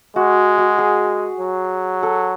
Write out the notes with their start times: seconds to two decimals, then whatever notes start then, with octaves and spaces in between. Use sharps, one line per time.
0.16 G#3 F#4
0.58 F#4
0.78 G#4
1.40 F#3
2.03 A4